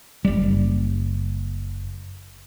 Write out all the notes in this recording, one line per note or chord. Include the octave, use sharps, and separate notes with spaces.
F#1 G3